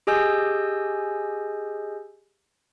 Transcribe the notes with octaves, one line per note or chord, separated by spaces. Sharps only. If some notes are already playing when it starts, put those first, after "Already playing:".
G4 G#4 D#5 G#5 E6 G6